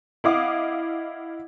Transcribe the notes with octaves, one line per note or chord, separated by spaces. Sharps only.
E4 D#5 F5 F#5 D6 D#6